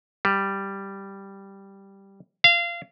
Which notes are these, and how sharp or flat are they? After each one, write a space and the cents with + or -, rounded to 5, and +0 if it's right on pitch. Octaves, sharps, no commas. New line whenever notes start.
G3 +0
F5 -25